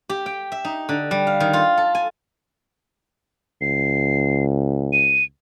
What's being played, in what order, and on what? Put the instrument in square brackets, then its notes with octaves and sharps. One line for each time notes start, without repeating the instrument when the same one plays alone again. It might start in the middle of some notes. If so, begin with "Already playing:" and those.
[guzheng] G4
G5
E5
D#4
D3
G3
F5
D#3
F4
A4
G#5
[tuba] C#2 [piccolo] C7
[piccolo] D#7